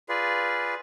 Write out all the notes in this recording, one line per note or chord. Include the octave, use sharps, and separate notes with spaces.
F4 G#4 B4 D5